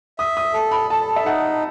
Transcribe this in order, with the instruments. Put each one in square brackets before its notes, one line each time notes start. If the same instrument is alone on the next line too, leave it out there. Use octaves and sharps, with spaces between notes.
[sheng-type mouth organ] E5 [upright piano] D#6
[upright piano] D#6
[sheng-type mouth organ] A4
[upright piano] B5
[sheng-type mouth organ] A4 [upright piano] A5
[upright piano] E5
[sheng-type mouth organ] D#4 [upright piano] F#5